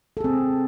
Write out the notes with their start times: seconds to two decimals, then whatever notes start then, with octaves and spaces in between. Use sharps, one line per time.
0.17 A4
0.21 G#4
0.24 C4